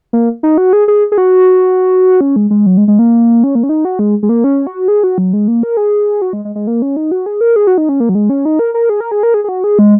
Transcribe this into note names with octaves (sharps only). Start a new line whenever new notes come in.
A#3
D#4
F#4
G#4
G#4
G#4
F#4
C#4
G#3
G#3
F#3
G#3
G#3
A#3
C#4
A#3
C#4
D#4
F#4
G#3
G#3
A#3
C#4
F#4
G#4
F#4
F#3
G#3
A#3
A#4
G#4
F#4
G#3
G#3
G#3
A#3
C#4
D#4
F#4
G#4
A#4
G#4
F#4
D#4
C#4
A#3
F#3
G#3
C#4
D#4
A#4
A#4
G#4
A#4
G#4
A#4
G#4
G#4
F#4
G#4
G#3